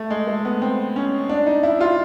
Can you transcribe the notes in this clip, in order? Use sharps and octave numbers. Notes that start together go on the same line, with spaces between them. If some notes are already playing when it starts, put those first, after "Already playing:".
Already playing: A3
G#3
A3
B3
C4
C#4
D4
D#4
E4
F4